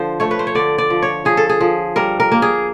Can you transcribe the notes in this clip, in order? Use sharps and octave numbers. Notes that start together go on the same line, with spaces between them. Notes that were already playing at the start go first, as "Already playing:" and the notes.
Already playing: D3 F3 C5
A3 C#5
B4
C5
C#5
D3 D5
D5
F3
C#5
F3 G#4
A4
G#4
F3
G3 A#4
A#4
A#3
G#4